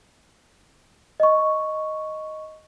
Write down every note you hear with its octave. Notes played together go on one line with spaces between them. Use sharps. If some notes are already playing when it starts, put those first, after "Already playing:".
D#5 C#6